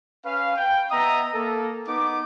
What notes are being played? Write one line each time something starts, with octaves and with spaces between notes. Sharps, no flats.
C#4 B4 F5
G5
B3 D#5 E5 A#5 D#6
A#3 A4
B3 D#4 D6